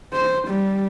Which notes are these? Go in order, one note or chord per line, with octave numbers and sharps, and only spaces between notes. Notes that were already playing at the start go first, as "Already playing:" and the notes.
C5
G3